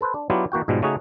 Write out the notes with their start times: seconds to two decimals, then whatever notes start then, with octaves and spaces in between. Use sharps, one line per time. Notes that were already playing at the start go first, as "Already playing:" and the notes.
0.01 A4 B4 C5
0.14 D4
0.30 F#3 B3 D4 E4 F4 G4
0.52 E3 A#3 F#4 G5
0.68 G#2 B2 F3 G3 G#3
0.82 C#3 A3 C#4 D#4 F#4 G#4